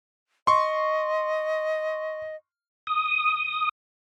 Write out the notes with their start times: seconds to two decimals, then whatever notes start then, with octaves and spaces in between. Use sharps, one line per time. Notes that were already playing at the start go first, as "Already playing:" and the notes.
0.47 D#5 C6 C#6
2.87 D#6